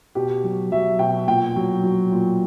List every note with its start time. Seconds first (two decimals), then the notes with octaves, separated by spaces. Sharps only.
0.15 B2 G4
0.44 F#3
0.72 F#3 E5
0.99 B2 G5
1.28 A#2 G5
1.56 F#3
1.84 F#3
2.12 A#2